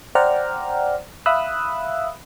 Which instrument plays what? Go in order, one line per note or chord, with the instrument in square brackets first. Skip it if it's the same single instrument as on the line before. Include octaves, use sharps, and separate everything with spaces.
[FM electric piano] C5 D5 F#5 G5 A#5 F6
E5 F5 B5 D#6 E6 F#6